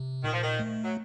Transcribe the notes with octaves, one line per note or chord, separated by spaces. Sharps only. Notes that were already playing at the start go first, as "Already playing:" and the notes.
Already playing: C3
A#2 D#3
F3
D#3
A3
F#3